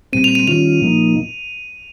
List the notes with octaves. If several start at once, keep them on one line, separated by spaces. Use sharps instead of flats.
A#2 G3 C4 D#7
F7
D#7
D#3 G3 C#4 F4 F7
A#2 F3 A#3 D#4